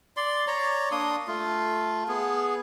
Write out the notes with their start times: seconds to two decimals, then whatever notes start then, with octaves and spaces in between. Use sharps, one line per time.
0.17 D5 C6
0.47 C#5 D5 A#5
0.91 A#3 D4 C6 D#6
1.27 A3 F4
2.08 B3 G#4